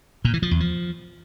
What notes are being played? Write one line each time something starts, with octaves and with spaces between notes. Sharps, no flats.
A#2
E3
F3
E2
F3